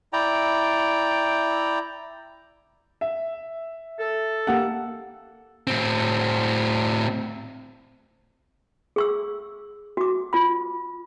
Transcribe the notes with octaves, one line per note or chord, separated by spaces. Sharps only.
E4 D5 G5 A#5
E5
A4
A#3 G4 F#5
A2 C4
G#4 C#6 E6
F#4 D6
F4 B5